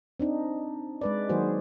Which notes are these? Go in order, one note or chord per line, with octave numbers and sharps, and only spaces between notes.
C4 D4 D#4
G#3 B4 D5
D#3 F#3 A#3 F#4 G#4 C5